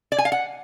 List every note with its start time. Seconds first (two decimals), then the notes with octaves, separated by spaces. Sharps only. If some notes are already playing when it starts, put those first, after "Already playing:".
0.12 D5
0.18 G#5
0.25 F5
0.32 F#5